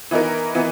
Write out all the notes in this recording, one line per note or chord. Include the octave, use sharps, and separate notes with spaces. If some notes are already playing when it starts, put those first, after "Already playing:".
E3 B3 D#4 A#4
E3 B3